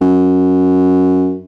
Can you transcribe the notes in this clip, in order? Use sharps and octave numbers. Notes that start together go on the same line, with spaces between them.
F#2